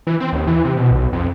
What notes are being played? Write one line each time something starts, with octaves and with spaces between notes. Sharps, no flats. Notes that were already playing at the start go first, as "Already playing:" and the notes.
E3
C4
D#2
E3
C3
B2
B1
F2